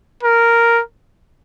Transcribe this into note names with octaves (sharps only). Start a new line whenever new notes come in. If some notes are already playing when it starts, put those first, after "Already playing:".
A#4